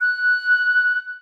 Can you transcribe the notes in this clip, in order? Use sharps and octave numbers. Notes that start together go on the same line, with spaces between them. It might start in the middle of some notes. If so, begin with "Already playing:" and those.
F#6